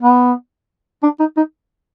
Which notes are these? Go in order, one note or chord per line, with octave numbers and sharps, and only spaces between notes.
B3
D4
D#4
D#4